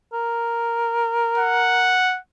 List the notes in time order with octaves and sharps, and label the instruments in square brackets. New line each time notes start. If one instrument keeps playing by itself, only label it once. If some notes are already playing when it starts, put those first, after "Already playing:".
[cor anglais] A#4
[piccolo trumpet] F#5